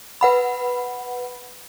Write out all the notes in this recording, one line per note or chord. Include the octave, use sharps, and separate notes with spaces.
B4 F#5 B5